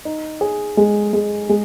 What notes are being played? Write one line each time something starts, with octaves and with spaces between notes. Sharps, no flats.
D#4
G#4
G#3
G#3
G#3